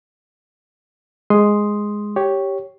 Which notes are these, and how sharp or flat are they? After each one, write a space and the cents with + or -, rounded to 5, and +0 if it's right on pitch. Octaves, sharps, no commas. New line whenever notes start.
G#3 +0 C6 +0 D#6 +0
G4 -5 C#5 +0